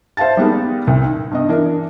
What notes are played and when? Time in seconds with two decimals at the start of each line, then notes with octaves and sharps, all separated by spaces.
0.17 C5 E5 F5 A5 A6
0.37 G3 G#3 A#3 B3 D#4 A#4
0.87 C2
1.04 D#4
1.31 G2 B3 D#5
1.49 E3 D4 A#4